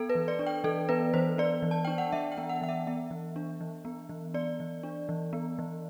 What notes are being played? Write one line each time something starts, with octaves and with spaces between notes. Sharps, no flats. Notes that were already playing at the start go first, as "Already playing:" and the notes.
Already playing: B3 A4
B4
E3
D5
D4
G5
E3 A4
B3 B4
E3 C5
B3 D5
E3
A5
D4 G5
F#5
E3 E5
G5
B3
F#5
E3 F#5
E5
B3 E5
E3
D4
E3
B3
E3
B3 D5
E3
D4
E3
B3
E3